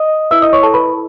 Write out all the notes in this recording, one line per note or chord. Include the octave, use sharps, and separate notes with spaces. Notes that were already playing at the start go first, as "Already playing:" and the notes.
Already playing: D#5 D#6
E4 B4 E5 E6
D#5 D#6
C#5 C#6
A4 A5
B4 B5